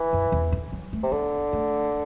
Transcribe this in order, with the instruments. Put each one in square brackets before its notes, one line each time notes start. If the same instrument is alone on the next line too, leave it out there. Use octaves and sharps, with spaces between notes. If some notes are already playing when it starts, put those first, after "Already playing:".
Already playing: [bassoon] E3
[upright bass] F#2
E2
D3
F#3
A3
[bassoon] C3
[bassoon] D3 [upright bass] B3
[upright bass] A3